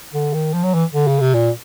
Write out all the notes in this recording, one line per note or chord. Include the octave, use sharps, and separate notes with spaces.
D3
D#3
F3
F#3
E3
D3
C#3
C3
A#2